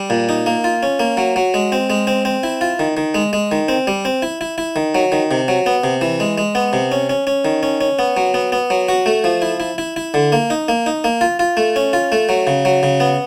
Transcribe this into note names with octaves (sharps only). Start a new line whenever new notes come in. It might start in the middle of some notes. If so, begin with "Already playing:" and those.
Already playing: G3
A#2
D#4
A#3
F4
C#4
A#3
F#3
F#3
G#3
C4
G#3
C4
C4
E4
F4
D#3
D#3
G#3
G#3
D#3
C4
G3
C4
E4
E4
E4
D#3
F#3
D#3
C3
F#3
B3
C3
E3
G#3
G#3
B3
C3
C#4
C#4
C#4
D#3
C#4
C#4
B3
F#3
B3
B3
F#3
F#4
A3
F3
E4
E4
E4
E4
D3
A#3
D#4
A#3
D#4
A#3
F4
F4
A3
C#4
F4
A3
F#3
C#3
F#3
C#3
B3